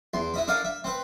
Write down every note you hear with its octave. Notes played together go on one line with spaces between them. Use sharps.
E2 C6
E4 D#5 B5
D4 A4 A#4 D#5 F5
E5
C4 B4